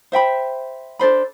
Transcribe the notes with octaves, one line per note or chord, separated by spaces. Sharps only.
C5 E5 G5 B5
D4 A4 C5 B5